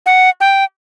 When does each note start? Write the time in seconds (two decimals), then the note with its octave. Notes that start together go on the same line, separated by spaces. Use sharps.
0.06 F#5
0.41 G5